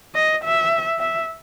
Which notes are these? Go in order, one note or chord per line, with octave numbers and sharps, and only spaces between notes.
D#5
E5
E5